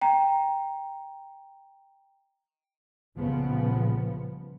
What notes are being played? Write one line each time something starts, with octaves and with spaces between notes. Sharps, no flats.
G5 A#5
C2 A#2 C#3 F3 B3